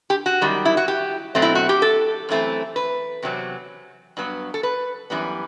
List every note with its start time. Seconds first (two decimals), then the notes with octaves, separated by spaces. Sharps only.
0.10 G4
0.26 F#4
0.41 F#2 D#3 G3
0.65 E4
0.77 F#4
0.88 G4
1.35 B2 F#3 A3 C4
1.42 E4
1.55 F#4
1.69 G4
1.82 A4
2.29 F#2 E3 A3 C4
2.76 B4
3.22 E2 C3 F#3 C4
4.17 G2 F#3 B3
4.54 A4
4.63 B4
5.10 F#2 E3 G3 B3